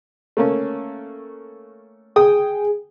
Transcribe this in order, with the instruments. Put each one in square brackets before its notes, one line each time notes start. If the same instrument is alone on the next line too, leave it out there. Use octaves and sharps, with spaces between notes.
[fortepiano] A3 A#3 C#4
[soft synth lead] G#4 [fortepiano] G5 D#6